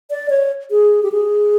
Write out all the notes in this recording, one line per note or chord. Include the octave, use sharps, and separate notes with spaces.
D5
C#5
G#4
G4
G#4